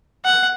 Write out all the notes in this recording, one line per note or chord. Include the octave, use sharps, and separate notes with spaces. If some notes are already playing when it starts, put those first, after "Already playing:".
F#5